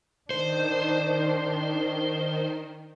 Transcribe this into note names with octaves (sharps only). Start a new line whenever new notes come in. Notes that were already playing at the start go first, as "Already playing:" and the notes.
D#3 D4 C5